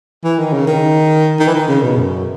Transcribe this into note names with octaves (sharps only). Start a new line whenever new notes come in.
E3
D#3
C#3
D#3
D#3
E3
D#3
C#3
B2
F#2